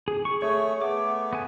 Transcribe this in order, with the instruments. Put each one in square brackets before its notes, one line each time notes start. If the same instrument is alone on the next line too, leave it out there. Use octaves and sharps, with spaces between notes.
[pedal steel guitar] G#4
C#6
[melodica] A3 [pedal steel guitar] G#4 C#5
[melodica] A3 B3 [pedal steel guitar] D6
[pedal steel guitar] B3 G#5